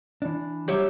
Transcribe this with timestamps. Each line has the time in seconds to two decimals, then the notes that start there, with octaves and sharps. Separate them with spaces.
0.22 E3 D4
0.68 F#3 G3 G4 C#5 E5